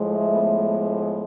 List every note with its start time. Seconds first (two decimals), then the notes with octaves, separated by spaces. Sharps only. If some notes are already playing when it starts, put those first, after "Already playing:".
Already playing: A2 F3 G#3
0.10 A3
0.35 B3